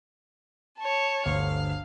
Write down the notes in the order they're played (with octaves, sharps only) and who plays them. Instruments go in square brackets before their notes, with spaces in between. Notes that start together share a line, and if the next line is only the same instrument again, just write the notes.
[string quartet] C#5 A5
[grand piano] G1 D2 [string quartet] F5